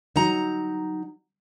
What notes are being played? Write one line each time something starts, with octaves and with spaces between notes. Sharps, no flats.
F#3 D#4 A#5